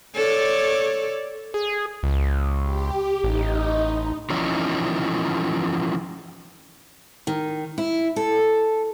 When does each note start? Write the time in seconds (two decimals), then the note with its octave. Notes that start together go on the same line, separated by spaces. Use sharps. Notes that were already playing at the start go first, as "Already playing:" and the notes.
0.15 A4 C#5 D5
1.54 G#4
2.03 C#2
2.63 G4
3.24 A1 D#4
4.30 E3 F3 C#4 D#4
7.27 D#3
7.78 E4
8.16 A4